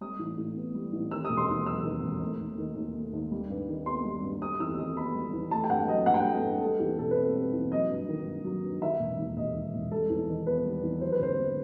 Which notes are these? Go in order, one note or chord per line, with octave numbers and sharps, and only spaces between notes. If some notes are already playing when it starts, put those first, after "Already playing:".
G3 D#6
A1
A2
B3
G3
A1
D#3 E6
E1 D#6
C6
D#2 D#6
F#3 E6
D#3
E1
A3
D#2
D#3
D#2
A3
D#2
G3
G2
D#3
B3 C6
G3
G2
G3 D#6
E2 E6
D#3 D#6
B3 B5
G3
E2
A3 A5
G5
G2 F#5
F#3 D#5
G2 F#5
G5
A3 F#5
A4
G2
G3 A4
E2 G4
B2 A4
B4
C4 A4
G3
E2
F#3 D#5
G2
D#3
G2
F#3
G2
D#3 E5
E1
D#2
E1 D#5
D#3
E1
G3 A4
E2
D#3
B3 B4
G3
E2
F#3 C5
B4
G1 C5
G2